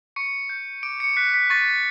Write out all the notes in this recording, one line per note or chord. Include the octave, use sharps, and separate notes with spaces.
C#6 C#7
G6
D6 D7
C#7
F#6 B6
B6
C#6 A6